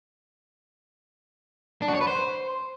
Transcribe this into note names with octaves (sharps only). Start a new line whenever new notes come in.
D4
F#4
C#5
B4
C5